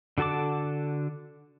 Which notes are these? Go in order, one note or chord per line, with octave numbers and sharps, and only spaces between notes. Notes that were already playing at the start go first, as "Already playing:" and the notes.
D3 F#4 A4 A5 D6